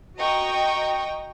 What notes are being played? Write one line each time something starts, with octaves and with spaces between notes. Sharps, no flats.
F#4 D#5 G5 A#5 C#6 D#6